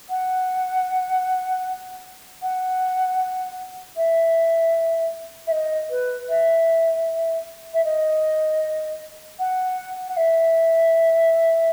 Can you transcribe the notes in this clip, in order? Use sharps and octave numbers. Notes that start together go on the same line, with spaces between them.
F#5
F#5
E5
E5
D#5
B4
E5
E5
D#5
F#5
F#5
E5